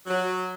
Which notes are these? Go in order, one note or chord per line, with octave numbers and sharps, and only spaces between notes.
F#3